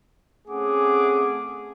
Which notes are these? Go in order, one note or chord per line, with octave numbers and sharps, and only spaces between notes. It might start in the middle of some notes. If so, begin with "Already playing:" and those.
A3 C4 C#4 G#4 F#5 D6